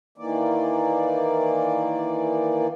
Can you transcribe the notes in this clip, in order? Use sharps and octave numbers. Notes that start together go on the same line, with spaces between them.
D#3 E3 A#3 D5